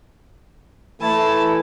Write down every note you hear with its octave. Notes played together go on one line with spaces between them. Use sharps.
E3 A3 E4 A5